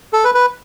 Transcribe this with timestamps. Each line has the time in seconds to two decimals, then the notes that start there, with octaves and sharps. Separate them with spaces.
0.13 A4
0.24 B4
0.35 B4